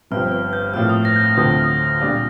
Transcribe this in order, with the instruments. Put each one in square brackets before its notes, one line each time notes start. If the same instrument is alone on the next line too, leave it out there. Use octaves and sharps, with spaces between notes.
[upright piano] G1 G2 F3 C4 [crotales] F6
[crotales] F6
G6
[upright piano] A2 F3 A#3 [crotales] F6
[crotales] D#6
A#6
G6
F6
[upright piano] D2 D3 F3 C4 [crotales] D#6
[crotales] F6
D#6
[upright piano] A#2 G3 D4 F4